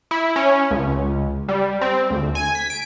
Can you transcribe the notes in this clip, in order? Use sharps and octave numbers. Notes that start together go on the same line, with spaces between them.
E4
C#4
C#2
G3
C4
D2
G#5
B6
D7